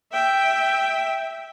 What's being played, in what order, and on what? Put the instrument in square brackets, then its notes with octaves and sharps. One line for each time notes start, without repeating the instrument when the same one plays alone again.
[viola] E5 G5